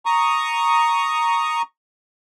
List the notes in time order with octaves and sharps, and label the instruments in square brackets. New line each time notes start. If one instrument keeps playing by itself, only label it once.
[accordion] A#5 C#6 D#6